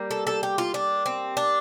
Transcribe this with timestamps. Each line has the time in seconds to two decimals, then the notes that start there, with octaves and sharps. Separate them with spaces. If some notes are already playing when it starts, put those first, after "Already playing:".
Already playing: G3 A#3
0.11 A4
0.27 A4
0.43 G4
0.58 F4
0.74 D4
1.06 C4
1.37 D4